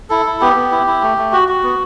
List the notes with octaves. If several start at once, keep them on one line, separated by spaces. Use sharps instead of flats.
E4 A4
E4
B3 G4
B3
E4
E4
A3
A3
F#4
F#4
B3